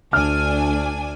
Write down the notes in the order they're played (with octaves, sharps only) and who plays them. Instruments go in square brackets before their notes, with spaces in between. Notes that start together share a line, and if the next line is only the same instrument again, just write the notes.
[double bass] D2 [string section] D4 G#5 [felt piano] F6